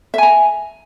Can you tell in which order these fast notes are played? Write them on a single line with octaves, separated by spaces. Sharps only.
E5 G#5 A#5